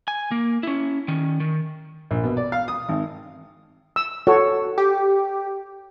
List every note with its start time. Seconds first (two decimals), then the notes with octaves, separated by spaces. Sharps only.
0.08 G#5
0.31 A#3
0.63 C#4 E4
1.08 D#3 C#4
1.40 D#3
2.11 A#1
2.24 B2
2.37 D5
2.52 F5
2.68 D#6
2.89 G#1
3.96 E6
4.27 F#4 A4 C#5
4.78 G4